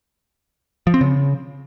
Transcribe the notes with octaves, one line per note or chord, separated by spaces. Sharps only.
F3
C4
C#3